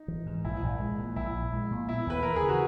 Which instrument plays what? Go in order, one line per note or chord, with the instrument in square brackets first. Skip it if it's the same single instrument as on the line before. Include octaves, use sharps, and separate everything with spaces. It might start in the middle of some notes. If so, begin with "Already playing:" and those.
Already playing: [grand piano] D#4
[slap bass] E3
G#2
[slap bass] A#1 [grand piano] E4
[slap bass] A#1
G#3
A#2
[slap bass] A#1 [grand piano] E4
[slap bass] A#1
G#3
A#2
[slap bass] B3 [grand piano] E4
[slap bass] D#2 [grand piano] B4
[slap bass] E3 [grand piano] A#4
[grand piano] G#4
[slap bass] C#3
[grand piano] F#4